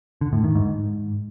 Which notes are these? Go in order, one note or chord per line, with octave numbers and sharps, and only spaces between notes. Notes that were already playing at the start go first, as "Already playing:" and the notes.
D3
A2
D#3
G#2